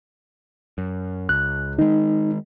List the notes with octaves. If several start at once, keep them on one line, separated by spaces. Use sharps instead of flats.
F#2
C#2 F#6
D#3 G#3 D#4